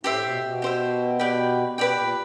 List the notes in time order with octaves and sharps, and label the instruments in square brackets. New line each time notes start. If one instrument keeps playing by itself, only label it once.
[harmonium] A2 [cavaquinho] G4 C5 E5
[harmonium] B2
B2
[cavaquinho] G4 C5 E5
G4 B4 D5 G5
[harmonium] B2 [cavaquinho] G4 B4 D5 G5
[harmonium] A#2